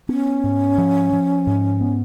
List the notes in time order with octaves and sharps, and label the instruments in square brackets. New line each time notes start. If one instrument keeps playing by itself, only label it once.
[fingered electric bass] B3 [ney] C#4
[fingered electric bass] G#2
F3
F3
G#2
B3